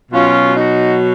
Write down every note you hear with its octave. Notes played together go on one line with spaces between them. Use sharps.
B2 F#3 C#4 F4
D#4 F#4